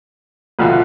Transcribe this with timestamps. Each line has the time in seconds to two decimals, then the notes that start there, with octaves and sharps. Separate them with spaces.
0.59 A1 D2 B2 F4